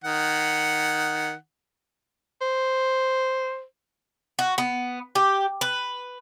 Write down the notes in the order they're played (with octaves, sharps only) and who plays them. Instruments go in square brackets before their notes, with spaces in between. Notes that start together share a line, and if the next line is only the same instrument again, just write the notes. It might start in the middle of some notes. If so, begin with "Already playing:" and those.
[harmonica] D#3 F#5
[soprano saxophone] C5
[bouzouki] F#4
B3
G4
B4